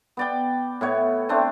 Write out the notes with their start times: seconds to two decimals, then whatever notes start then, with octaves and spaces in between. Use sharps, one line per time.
0.17 B3 D5 G5
0.81 A2 B3 C#5
1.29 A3 C4 D4